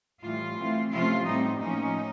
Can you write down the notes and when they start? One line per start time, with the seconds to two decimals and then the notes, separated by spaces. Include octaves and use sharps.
0.23 A2 E3 G3 F4
0.57 E3 A3 C4
0.91 C3 F3 A3 C#4 F4
1.25 A2 E3 G3 C4 D#4
1.59 A2 F3 A#3 C#4 D#4